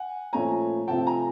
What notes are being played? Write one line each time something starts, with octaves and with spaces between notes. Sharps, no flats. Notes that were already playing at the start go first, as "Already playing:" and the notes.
Already playing: F#5 G#5
A#2 F3 A3 C#4 G#5 A#5
C3 F3 A3 C4 F4 G5 A5
G#5 A#5